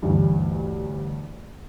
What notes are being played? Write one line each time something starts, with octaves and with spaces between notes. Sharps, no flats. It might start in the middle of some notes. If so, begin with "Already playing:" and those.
A1 D2 G2